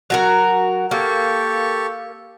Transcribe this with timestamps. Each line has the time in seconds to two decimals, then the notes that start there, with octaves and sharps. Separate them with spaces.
0.10 F#3 F#4 A#4
0.91 A#3 G4 A4 C#6